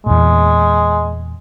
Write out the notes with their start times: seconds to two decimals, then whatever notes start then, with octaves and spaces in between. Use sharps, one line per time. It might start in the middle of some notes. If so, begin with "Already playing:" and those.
0.06 E2 A#2 G#3